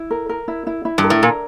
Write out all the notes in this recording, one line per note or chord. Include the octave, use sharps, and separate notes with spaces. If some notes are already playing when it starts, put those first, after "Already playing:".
Already playing: E4
A#4
A#4
E4
E4
E4
G2
A#4
A2
A#2 A#4